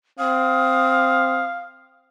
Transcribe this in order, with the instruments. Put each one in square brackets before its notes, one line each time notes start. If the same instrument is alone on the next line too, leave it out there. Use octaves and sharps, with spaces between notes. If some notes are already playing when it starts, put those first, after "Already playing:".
[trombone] C4 [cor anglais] F5 [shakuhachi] D#6